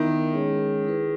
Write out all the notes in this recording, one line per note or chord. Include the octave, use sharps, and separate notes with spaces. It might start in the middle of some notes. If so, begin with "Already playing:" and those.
Already playing: D#3 B3 E4 A#4 E5
G#3 C#4 G#4 C#5
E4 G#4 B4